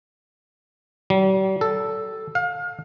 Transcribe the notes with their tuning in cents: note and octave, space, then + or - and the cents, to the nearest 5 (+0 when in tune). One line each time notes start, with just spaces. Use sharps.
G3 -40
A4 +0
F5 +30